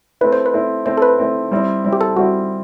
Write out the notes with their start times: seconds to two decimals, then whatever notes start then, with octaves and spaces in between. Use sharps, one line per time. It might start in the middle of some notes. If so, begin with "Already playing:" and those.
0.21 A3 C4 E4 B4
0.32 C5
0.46 B4
0.53 A3 C4 E4
0.86 A3 C4 E4 C5
0.97 A4
1.02 B4
1.18 A3 C4 E4
1.51 G3 C4 E4
1.85 G3 C4 E4
1.92 G4
2.01 A4
2.16 G3 C4 E4 F#4